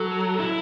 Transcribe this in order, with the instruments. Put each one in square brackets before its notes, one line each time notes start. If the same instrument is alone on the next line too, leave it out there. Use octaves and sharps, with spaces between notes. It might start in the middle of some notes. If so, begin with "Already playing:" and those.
Already playing: [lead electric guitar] F#3 [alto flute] A4
[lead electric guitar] E4 [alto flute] A4